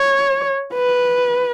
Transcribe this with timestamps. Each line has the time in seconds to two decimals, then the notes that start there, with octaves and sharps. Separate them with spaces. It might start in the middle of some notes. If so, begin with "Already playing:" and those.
Already playing: C#5
0.74 B4